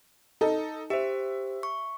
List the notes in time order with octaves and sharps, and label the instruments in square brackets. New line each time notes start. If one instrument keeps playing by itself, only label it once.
[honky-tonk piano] D#4 A4
[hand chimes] G4 C5 [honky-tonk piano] E5
[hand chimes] C#6